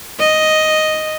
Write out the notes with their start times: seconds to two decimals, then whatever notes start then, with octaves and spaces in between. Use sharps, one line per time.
0.19 D#5